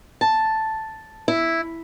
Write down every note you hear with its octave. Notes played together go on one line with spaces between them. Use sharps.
A5
E4